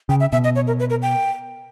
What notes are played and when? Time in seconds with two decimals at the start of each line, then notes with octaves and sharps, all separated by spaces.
0.09 C#3 G5
0.20 E5
0.32 B2 E5
0.44 D#5
0.55 C#5
0.67 A#4
0.80 B4
0.90 A#4
1.02 G5